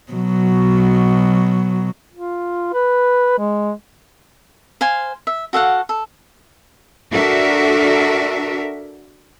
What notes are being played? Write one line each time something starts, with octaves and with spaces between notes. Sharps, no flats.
B2 F#3
F4
B4
G#3
C5 F5 G#5
E5
F#4 A4 F5 F#5
A4
D4 F#4 A4 A#4 E5